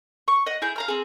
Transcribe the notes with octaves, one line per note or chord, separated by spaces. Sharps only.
C#6
D#5 F#5
E4 G#4 G6
F5 A#5 F6
C4 G#4